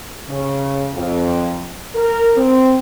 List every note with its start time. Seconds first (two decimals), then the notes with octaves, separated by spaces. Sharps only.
0.29 C#3
0.93 F2
1.95 A#4
2.36 C4